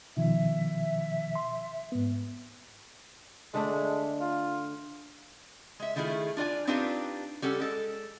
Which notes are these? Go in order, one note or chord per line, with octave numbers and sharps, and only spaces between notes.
B2 D#3 F3 E5
C6
G#2 B3
D3 G#3 A3 D4
F4
G#3 E5
D#3 A3 E4 F4 G#4
D4 F4 D5 G#5
C4 D4 D#4 F4 G4 B4
G3 C#4 A4 F#5
G#3 A4